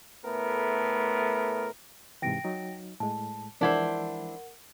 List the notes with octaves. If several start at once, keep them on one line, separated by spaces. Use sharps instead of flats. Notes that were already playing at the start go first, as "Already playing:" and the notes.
A2 A3 B3 A#4
G#2 C3 E3 G5 A#6 D7
F#3 D#4
A2 G#3 A5
E3 F3 G#3 D4 E4 A#4 C5 F#5